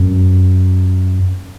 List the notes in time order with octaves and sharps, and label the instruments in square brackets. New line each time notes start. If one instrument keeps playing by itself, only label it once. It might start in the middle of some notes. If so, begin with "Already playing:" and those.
Already playing: [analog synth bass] F#2